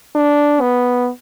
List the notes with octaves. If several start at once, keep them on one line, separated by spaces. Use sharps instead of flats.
D4
B3